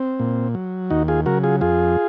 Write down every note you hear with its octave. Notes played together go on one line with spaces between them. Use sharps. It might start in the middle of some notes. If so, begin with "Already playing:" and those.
Already playing: C4
A#2
F#3
D#2 D#4 F#4
F4 G#4
C#3 F#3 F#4 A#4
F4 G#4
F2 F4 G#4